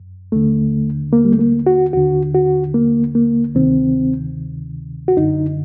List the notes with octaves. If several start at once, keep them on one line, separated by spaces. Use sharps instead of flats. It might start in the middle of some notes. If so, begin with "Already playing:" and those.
Already playing: F#2
D#2 D3 A3
A#3
G3
A3
A#3
F#4
D#2 D3 F#4
F#4
A#3
A#3
D2 C3 D#3 C4
F#4
F#2 D3 D#4